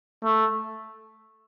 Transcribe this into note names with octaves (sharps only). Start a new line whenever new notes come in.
A3